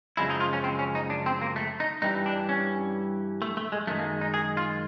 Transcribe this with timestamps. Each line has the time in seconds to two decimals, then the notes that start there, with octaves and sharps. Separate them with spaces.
0.17 F#2 C#3 F3 G#3 E4
0.30 D#4
0.40 F4
0.53 C#4
0.64 C4
0.79 C#4
0.95 D#4
1.10 D4
1.26 C4
1.41 A#3
1.56 A3
1.80 D#4
2.02 G2 E3 G3 D#4
2.26 D4
2.49 C#4
3.42 A3
3.57 A3
3.72 G#3
3.87 F#2 D#3 G#3 A3
3.99 A#3
4.21 D#4
4.34 G#4
4.57 F4